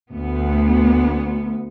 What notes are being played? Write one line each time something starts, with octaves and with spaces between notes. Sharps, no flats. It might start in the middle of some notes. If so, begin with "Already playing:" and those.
D2 B3